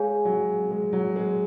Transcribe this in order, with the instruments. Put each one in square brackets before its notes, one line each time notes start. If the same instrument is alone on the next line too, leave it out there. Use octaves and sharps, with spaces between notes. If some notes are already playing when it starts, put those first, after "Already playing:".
Already playing: [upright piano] G#3 [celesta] G#4 C#5 F5 G#5
[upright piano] F#3
G#3
F#3
G#3